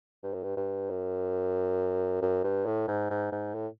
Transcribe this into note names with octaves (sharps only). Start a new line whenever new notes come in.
G2
F#2
G2
G2
F#2
F#2
G2
A2
G#2
G#2
G#2
A2